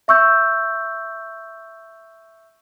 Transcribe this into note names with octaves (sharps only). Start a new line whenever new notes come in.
E5 C#6 E6 G6